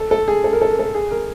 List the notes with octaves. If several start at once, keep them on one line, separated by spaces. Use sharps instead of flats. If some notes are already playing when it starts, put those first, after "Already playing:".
Already playing: A4
A4
G#4
A4
A#4
A4
A#4
A4
G#4
A#4